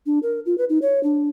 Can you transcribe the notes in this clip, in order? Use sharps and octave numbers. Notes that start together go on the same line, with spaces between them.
D4
A#4
F4
B4
D#4
C#5
D4